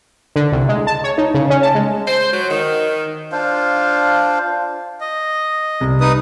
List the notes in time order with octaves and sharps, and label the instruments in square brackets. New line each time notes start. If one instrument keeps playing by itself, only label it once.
[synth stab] D3
C2
G#3
A5
C#5
D#4
C#3
C#4
A5
G#3
[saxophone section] C5
F#3
D#3
[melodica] D4 F4 C5 F5
[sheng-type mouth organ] D#5
[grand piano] C2
[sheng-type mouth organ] D#4 B4 D#6